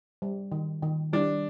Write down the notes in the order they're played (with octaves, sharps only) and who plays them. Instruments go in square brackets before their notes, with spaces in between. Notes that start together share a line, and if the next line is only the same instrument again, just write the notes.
[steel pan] G3
D#3
D#3
[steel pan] G3 [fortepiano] D4